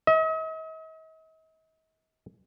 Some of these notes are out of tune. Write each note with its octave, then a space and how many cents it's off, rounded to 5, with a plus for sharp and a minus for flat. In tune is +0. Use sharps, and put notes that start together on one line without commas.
D#5 +45